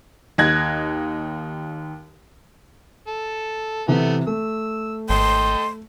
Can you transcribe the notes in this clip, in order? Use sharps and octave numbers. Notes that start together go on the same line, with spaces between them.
D#2 D#4 F#6 G#6 A#6
A4
C3 E3 A3 B3
A3 E6
G#1 A4 D#5 G5 C6